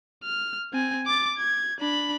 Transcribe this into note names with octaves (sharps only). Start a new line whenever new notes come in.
F6
C4 G#5
D6 A6
G#6
D4 B5